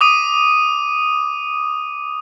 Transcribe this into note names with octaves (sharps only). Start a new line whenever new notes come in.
D6 D#6 D#7